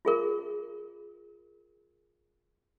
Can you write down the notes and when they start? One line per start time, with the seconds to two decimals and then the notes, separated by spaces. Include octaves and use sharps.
0.05 F4 G#4 A#4